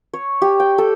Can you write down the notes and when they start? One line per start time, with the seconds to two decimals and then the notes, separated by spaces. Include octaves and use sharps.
0.13 C#5
0.42 G4
0.60 G5
0.78 A4